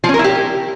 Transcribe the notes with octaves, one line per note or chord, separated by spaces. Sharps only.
F3
C#4
A#4
E4
G4